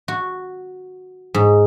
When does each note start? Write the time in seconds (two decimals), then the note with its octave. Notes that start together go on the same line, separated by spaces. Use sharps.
0.08 F#4
1.34 G#2